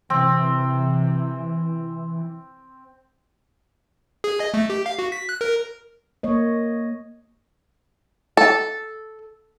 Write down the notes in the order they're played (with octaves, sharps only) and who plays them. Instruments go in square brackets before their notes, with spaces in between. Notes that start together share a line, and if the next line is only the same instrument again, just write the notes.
[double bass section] C3 [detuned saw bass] E3 [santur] C4
[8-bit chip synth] G#4
D#5
A3
G4
F5
F#4
B6
F#6
A#4
[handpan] A#3 C#5 D#5
[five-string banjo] A4